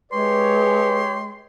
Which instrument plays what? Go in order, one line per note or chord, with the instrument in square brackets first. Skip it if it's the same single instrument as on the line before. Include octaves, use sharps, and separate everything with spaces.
[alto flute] G#3 [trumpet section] G4 C#5 [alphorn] B4 [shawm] C6